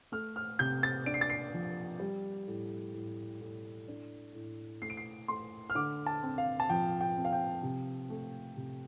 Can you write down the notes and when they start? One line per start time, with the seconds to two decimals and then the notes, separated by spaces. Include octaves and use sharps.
0.12 A3 F6
0.36 F6
0.59 C3 G6
0.83 A6
1.06 D4 D7
1.14 C7
1.21 A6
1.30 C7
1.54 F3
2.00 G3
2.48 A2
2.94 A2
3.41 A2
3.88 D4
4.35 A2
4.82 A3 C7
4.90 D7
4.97 C7
5.28 A3 C6
5.70 F6
5.75 D3 D6
6.06 A5
6.23 C4
6.38 F5
6.60 A5
6.70 F3 G5
7.01 G5
7.16 C4
7.25 F5
7.32 G5
7.63 C3
8.10 A3
8.57 C3